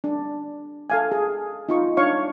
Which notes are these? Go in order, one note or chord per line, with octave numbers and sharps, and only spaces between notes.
D4
A4 F5 G#5
G#4
D#4 F4 C#6
D4 C#5 F5 C#6